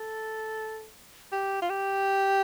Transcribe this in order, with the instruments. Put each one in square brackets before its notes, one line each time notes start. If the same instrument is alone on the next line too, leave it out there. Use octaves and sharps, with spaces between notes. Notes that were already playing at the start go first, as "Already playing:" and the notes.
Already playing: [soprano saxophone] A4
G4
F4
G4